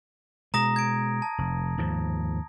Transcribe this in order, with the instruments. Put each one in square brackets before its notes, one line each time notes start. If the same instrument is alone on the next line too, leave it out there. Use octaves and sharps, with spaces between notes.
[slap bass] B2 G#3 [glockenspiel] A#5 D#6 A#6
[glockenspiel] G#6 D7
A5
[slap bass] F1
D#2 G#2 F3